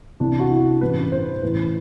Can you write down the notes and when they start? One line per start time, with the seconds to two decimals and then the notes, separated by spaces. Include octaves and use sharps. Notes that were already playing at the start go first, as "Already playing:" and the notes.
0.20 C2 C3 E3 D4
0.39 F#4
0.50 E4
0.81 A1 G2 E3 B4
1.12 C5
1.42 A1 A2 E3 B4